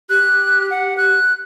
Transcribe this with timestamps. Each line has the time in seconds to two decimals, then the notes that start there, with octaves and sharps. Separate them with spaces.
0.10 G4 F#6
0.70 F#5
0.97 F#6